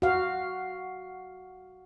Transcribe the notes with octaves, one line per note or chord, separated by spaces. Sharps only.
F#4 F5